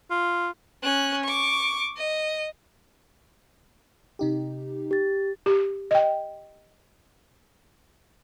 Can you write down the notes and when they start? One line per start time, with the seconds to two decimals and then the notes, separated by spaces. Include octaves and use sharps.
0.11 F4
0.83 C#4 F#6
1.24 C#6 D6
1.97 D#5
4.19 C3 D#4 G4
4.91 G4 A6
5.46 G4
5.91 D#5 G5